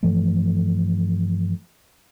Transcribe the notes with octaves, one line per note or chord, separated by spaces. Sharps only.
G2 E3 F3 A3